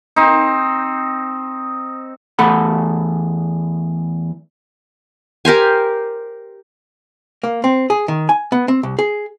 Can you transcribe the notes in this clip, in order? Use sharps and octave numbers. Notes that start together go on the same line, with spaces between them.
C4 D#4
E2 A3 A4 F#5 B5
G4 A#4 C5 G#5
A#3
C4
G#4
D#3
G#5
B3
C4
C2
G#4